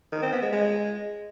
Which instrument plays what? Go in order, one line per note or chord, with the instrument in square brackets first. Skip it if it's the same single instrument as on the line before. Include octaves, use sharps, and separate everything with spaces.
[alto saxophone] D#3
C4
B3
G#3
G#3